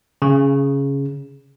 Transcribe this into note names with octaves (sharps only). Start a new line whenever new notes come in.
C#3